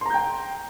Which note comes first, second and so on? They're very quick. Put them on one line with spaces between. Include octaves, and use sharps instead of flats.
C6 A#5 G6 G5